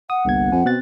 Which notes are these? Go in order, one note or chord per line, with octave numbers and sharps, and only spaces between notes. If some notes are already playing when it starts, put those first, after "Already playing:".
F#5 D#6
G1 C2 A#3 G#6
F2 G#5
B2 C4 F#6 A6